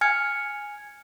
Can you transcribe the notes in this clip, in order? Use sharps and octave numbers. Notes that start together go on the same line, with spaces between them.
G#5 F6 G#6 C#7